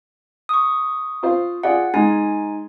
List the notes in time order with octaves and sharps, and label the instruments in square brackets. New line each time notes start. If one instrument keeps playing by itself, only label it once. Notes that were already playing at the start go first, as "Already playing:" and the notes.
[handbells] C#6 D#6
[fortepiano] F4 C5
[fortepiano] F4 G#4 D5 [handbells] F#5
[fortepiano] G#3 [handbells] D#4 G#5